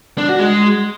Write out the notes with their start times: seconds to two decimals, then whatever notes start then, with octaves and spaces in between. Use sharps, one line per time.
0.18 D4
0.29 F#4
0.39 G#3